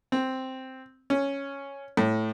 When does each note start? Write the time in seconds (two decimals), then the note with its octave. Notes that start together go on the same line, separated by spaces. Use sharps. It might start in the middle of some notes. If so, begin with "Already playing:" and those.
0.12 C4
1.10 C#4
1.97 A2